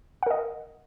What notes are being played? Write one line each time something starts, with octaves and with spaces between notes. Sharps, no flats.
A#4 D#5 F#5